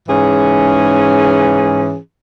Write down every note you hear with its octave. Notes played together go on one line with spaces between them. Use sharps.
G#2 E3 C#4 G#4